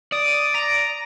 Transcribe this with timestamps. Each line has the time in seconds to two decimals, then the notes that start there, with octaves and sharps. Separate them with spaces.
0.12 D5 D#6
0.54 A#5